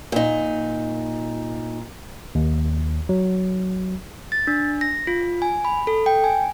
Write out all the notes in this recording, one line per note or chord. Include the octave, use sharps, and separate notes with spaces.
A#2 D#4
D#2
F#3
A6
D4
A#6
F4
G#5
B5
A4
G5
G#5